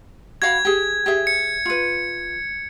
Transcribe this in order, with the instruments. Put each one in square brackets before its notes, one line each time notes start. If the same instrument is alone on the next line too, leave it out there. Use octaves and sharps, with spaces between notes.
[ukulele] F#4 F5 B5 [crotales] G#6
[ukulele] G4 G#4
G4 G#4 E5
[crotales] C#7
[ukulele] F4 B4